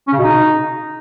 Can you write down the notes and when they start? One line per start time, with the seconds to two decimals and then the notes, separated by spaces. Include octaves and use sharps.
0.08 C#4
0.13 C#3
0.18 B2
0.24 D#4